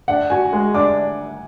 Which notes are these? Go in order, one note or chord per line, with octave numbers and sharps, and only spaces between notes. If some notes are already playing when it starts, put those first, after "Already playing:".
D4 F#5
F#4 G#5
G#3
D4 D6